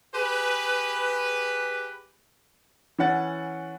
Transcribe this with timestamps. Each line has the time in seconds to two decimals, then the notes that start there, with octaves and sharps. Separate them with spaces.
0.15 G4 G#4 B4
2.99 E3 C#4 F#5 A6